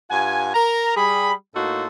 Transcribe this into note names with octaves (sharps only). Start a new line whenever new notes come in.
G2 F4 F#5 G#5
A#4 A#5
G3 G#4 B5
A2 A#3 D#4 F#4 A4 C6